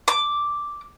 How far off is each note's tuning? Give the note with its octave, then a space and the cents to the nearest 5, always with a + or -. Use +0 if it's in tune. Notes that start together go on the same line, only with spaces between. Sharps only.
D6 +0